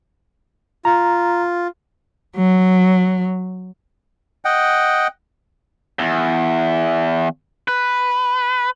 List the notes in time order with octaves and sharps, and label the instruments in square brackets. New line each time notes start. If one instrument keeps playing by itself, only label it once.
[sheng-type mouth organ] F4 [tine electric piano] A#5
[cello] F#3
[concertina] D#5 F#5 G5
[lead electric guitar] E2
B4